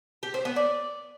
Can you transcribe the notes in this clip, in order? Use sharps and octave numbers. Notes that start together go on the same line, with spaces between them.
G4
C5
B3
D5